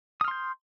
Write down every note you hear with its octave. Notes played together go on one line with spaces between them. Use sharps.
C6 D#6 F6 G6